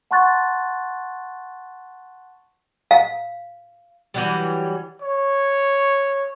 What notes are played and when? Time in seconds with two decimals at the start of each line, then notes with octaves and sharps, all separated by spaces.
0.11 F#5 A5 C6 C#6 F#6 A6
2.91 F5
4.14 E3 F#3 G3
5.02 C#5